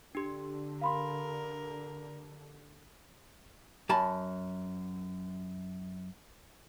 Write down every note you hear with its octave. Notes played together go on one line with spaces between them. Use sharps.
D3 D4 G4
A#4 F5 B5 C6
F#2 G#5 A5 B5